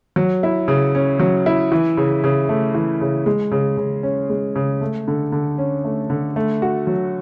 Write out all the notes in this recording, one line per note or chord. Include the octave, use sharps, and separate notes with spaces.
F#3
E4
C#3
C#4
F#3
E4
E3
C#3
C#3
A3
E3
C#3
G#3
C#3
C#3
C#4
G#3
C#3
A3
D3
D3
C#4
A3
D3
A3
F#4
F#3